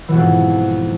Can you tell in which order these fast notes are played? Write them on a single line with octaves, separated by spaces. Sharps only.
E3 B2 F2 G#2